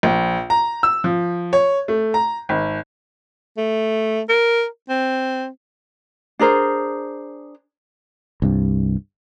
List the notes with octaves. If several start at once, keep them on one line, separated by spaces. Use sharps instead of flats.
A#1
A#5
E6
F3
C#5
A3
A#5
G#1
A3
A#4
C4
D4 G#4 A#4 C5
C2 G2